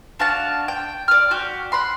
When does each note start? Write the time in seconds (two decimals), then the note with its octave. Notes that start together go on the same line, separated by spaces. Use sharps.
0.19 D4 F#4 F5 A5
0.68 G5
1.08 D5 F6
1.31 F#4 G4
1.72 F#5 B5 C6